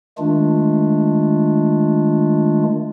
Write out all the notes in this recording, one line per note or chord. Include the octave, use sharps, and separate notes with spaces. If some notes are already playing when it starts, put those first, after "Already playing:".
D#3 G#3 A3 D4 F4